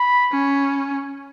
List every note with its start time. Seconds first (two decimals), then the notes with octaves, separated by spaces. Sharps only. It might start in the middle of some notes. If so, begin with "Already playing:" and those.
Already playing: B5
0.32 C#4